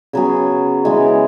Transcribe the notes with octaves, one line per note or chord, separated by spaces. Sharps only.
C#3 F#3 B3 G#4
C#3 E3 G#3